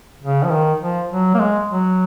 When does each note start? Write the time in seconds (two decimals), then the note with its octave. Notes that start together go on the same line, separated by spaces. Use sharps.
0.23 C#3
0.45 F3
0.52 D#3
0.81 F3
1.10 F#3
1.34 A#3
1.39 G#3
1.68 F#3